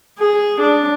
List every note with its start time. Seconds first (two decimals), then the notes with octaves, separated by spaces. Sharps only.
0.19 G#4
0.61 D4